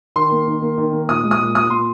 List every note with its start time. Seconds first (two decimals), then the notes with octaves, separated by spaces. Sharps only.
0.16 D#3 C6
0.32 A#3
0.48 D#3
0.62 A#3
0.78 D#3
0.93 A#3
1.09 A#2 D#6
1.24 G#3
1.31 D#6
1.40 A#2
1.55 A#2 D#6
1.70 A#2 C6